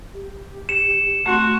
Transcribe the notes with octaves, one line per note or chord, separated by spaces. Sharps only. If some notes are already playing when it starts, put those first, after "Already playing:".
G4
C#7 E7
A3 C4 F#4